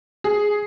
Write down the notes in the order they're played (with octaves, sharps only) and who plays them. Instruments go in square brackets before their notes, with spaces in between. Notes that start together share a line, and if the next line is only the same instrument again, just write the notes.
[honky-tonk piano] G#4